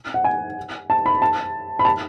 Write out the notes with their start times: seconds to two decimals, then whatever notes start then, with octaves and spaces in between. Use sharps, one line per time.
0.14 F#5
0.24 G#5
0.90 A5
1.06 B5
1.22 A5
1.79 B5
1.85 A5